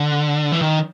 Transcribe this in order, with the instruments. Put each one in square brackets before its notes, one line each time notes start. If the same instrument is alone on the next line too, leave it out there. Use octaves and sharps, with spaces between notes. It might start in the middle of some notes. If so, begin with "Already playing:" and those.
Already playing: [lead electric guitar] D3
E3
D#3